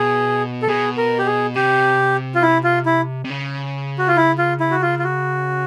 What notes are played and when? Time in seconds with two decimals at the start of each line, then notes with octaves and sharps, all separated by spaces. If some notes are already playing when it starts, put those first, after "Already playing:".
Already playing: B2 G#4
0.62 A4
0.68 B2 G#4
0.98 A#4
1.19 G4
1.26 G#4
1.55 C3 G4
2.35 F4
2.43 E4
2.64 F4
2.86 E4
3.25 C3
3.30 C#3
3.98 F#4
4.07 F4
4.17 E4
4.38 F4
4.60 E4
4.71 F#4
4.82 F4
4.99 F4
5.04 F#4